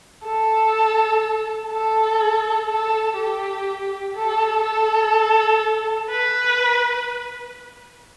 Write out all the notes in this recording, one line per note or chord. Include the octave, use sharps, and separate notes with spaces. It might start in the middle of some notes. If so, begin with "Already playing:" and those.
A4
A4
A4
G4
A4
A4
B4